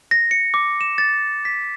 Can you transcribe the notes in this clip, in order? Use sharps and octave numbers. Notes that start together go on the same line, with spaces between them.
A#6
C#7
D6
E7
A6
B6